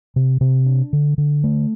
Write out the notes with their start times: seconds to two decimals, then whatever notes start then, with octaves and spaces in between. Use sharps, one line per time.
0.16 C3
0.41 C3
0.66 D4
0.93 D3
1.18 D3
1.44 A3